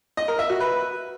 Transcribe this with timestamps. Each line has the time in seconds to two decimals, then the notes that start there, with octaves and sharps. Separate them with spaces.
0.17 D#5
0.28 A#4
0.39 E5
0.50 F#4
0.60 B4